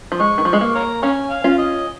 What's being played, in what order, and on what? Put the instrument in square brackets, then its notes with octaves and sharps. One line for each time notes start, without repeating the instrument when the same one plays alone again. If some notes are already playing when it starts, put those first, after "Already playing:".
[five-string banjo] F3
[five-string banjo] G#3 [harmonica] C#6
[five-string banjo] D#3
[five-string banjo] F3 [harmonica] C#6
[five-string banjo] G#3
A#3
[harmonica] C#5 F5 A#5
[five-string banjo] C#4 [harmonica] C#5 F5 G#5
[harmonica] F5
[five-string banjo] C#4 F4
[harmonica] D#5